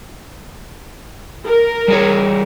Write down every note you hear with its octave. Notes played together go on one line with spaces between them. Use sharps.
A#4
G3 G#4 C#5